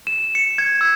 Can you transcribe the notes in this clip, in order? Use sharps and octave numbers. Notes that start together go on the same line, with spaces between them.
E7
C#7
G#6
E6